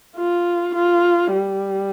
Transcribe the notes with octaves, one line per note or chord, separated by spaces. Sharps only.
F4
F4
G3